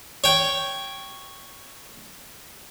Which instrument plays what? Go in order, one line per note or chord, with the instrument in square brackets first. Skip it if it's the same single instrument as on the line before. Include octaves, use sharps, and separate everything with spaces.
[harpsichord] C#5 G5